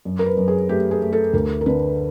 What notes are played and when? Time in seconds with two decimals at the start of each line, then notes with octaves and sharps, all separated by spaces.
0.05 F#2
0.19 A#4
0.26 B4
0.37 F#2
0.48 G#4
0.69 A3 G4
0.91 G#4
1.02 A3
1.13 A4
1.34 D2 A#4
1.61 A#4
1.66 D3 B4